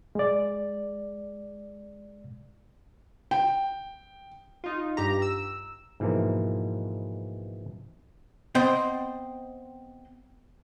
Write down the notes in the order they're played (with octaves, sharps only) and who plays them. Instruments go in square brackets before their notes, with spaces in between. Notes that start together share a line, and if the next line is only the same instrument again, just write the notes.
[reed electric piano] G#3 D5
[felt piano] G5
[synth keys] D#4 F4
G2 G4 A#5
E6
[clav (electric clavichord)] G#2 B2 E3 F3 A#3
[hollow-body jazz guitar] B3 C4 C5 D#5 G5